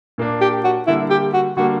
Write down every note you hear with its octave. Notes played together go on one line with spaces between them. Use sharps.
A#2 A#3 D4
G4
F#4
D3 G3 A#3 E4
G4
F#4
D3 G3 A#3 F#4